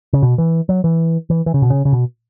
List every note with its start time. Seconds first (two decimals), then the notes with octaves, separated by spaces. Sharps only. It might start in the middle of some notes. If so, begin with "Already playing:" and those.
0.13 C#3
0.22 B2
0.38 E3
0.69 F#3
0.84 E3
1.30 E3
1.46 E3
1.54 C#3
1.62 B2
1.70 C#3
1.85 C#3
1.92 B2